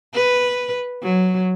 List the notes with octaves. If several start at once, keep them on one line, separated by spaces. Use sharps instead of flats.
B4
F#3